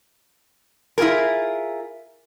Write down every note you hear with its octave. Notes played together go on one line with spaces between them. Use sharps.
E4 F4 G4 G#4 A#4